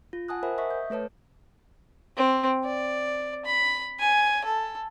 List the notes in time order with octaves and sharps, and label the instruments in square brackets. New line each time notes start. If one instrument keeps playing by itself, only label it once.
[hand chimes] F4
F#5 G#5 A5 D#6 F#6
A#4 C5 E5 F#5 G#5 B5
D#5 E5 C#6 D#6 B6
G6
A3 A4 B4 C#5 A5
[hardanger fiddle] C4
D5
B5
G#5
A4